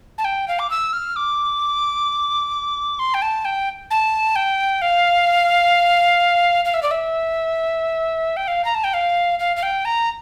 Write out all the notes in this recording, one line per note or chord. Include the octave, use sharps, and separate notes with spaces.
A5
G5
F5
D6
E6
F6
D6
C6
G5
A5
G5
A5
G5
F5
F5
E5
D5
E5
G5
F5
A#5
A5
G5
F5
F5
F5
G5
A#5